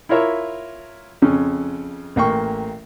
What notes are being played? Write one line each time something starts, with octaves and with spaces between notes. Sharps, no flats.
E4 F4 A#4 C#5 E5
F2 C#3 C#4
A1 A#3 G5 C#6